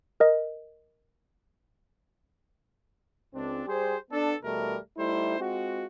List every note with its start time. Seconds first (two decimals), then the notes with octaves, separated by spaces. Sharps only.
0.20 A#4 D#5
3.34 C#2 C4 D4
3.66 G3 G4 G#4 C5
4.10 B3 D4 A4
4.43 E2 B2 G3 A3 A#4
4.97 G3 A3 D#4 E4 C5
5.39 G#3 C4 F4 F#4